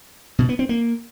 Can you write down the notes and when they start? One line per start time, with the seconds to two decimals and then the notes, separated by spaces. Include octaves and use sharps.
0.39 B2
0.49 B3
0.59 C4
0.69 A#3